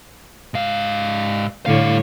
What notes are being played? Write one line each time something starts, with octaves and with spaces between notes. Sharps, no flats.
G#2 F5
A2 D3 G3 C#5 F5